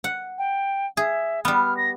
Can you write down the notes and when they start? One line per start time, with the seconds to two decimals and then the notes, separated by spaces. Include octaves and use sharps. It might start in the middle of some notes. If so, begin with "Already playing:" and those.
0.04 F#5
0.38 G5
0.97 G#4 E5
1.45 G3 B3 F6
1.77 A#6